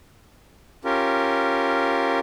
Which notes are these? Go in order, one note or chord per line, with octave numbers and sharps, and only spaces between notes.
C#4 F4 G4 A#4